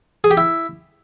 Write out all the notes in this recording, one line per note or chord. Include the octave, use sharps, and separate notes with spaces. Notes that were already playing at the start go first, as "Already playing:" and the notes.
G#4
G4
E4